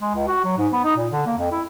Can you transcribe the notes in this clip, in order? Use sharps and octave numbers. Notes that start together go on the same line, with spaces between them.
G#3
C#2
F#4
F#3
G#2
B3
D#4
A#2
D3
A#3
F2
E4